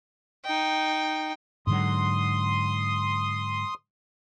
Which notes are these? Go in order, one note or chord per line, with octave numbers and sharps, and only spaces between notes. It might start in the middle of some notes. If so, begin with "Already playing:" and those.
D#4 G5
G#2 D3 F#3 C6 D#6